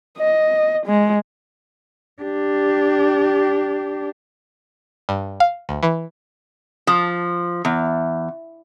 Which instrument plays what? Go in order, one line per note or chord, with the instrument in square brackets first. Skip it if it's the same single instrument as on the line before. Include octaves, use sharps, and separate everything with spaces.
[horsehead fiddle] D#5
G#3
[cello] D4 G4
[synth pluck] G2
F5
D2
E3
[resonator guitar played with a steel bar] F3
E2